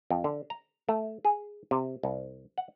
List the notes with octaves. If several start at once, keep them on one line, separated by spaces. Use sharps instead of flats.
F2
D3
A#5
A3
G#4
C3
C2
F#5